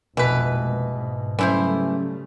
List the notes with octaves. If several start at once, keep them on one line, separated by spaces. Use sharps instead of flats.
F1 A#1 B2 E3 G#3 B4
G#2
C#3 E3 F#3 G3 A3 C#4 E4 C5